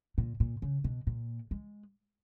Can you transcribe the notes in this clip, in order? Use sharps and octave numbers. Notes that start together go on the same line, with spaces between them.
A#2
A#2
C#3
B2
A#2
G#3